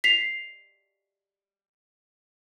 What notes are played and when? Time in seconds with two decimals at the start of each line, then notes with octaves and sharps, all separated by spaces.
0.04 B6 C7 F7